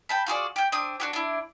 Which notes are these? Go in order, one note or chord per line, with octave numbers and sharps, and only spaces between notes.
G5 A5 B5
F4 F#4 G#4 D5
G4 G5
C4 D4 D#6
D4 F#4 G4
D4 E4